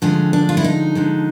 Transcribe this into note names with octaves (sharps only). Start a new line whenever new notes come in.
D3 F3 G#3 C#4
D4
F4
E4
D#4
D3 F3 G#3